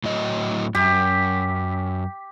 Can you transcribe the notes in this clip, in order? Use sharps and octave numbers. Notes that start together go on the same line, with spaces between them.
A2 F#3 D#5
F#2 G4